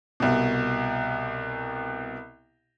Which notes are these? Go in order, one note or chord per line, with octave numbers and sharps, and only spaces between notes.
C2 B2